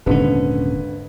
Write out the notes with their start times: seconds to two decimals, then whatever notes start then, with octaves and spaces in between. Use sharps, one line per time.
0.06 D#1 G#1 D3 C#4 B4